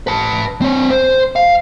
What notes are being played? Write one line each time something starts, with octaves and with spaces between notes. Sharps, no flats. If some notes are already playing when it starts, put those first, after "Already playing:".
B4 A5
C4 C#5
C5
F5